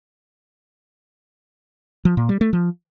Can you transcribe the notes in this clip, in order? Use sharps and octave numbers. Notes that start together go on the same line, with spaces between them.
F3
A#2
G3
A3
F3